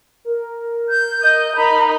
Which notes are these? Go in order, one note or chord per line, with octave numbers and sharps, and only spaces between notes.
A#4
G6
D#5
D#4 A#4 B5